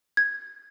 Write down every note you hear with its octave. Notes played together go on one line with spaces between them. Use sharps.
G#6